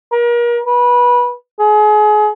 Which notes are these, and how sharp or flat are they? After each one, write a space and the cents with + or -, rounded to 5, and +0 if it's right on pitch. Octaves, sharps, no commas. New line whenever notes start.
A#4 +35
B4 -20
G#4 +30